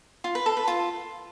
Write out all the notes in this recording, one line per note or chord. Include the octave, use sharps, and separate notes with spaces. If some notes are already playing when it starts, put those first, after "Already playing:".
F4
B4
A4
B4
F4